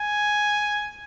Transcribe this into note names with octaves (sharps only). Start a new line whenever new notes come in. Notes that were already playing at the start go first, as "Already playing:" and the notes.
Already playing: G#5